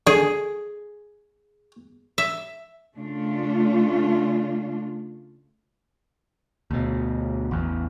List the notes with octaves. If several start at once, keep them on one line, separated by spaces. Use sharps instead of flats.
D3 G#4
E5
C#3 A3 D4 F4
D2 B2
A1 E2